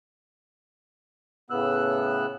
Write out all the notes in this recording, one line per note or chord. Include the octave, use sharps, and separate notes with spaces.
A2 C#3 B3 E6 F#6